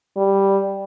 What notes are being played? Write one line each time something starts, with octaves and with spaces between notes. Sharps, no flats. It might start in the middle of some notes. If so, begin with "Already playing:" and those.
G3